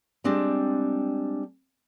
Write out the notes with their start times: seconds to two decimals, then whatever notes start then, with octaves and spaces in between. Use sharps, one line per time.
0.24 G3 G#3 C4 D4